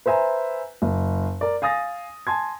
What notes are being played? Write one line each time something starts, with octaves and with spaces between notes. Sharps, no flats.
B4 C5 E5 G#5 A#5
F#1
A#4 D5
F5 G#5 D#6 A6 A#6
G#5 A5 C6 G#6